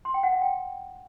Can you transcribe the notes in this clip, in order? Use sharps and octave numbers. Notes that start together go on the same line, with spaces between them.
C6
G5
F#5
F5
G5